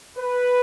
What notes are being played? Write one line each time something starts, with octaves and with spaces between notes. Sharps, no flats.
B4